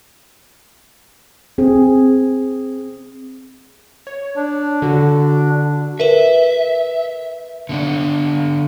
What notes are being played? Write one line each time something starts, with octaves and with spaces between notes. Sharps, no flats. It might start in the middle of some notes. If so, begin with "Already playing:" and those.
C4 G#4
C#5
D4
D3 F#4
A#4 B4 E5
D3 B3 D4